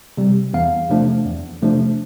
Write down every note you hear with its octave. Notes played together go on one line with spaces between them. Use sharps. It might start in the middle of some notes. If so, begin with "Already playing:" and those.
C3 G3
E2 F5
C3 F3 A3 D4
E2
C3 F3 A3 D4